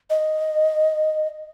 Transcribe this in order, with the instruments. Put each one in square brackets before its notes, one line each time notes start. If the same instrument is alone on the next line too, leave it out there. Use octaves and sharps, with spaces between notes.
[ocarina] D#5